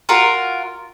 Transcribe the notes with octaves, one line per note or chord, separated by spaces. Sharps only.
F4 F#4 A#4